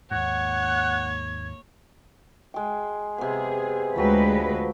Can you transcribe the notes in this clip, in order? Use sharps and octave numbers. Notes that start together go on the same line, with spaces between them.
D#2 G#2 A#3 C#5 F#5 G#6
G#3 G5
C3 B3 G#4
D2 F3 F#3 G#3 B4 G5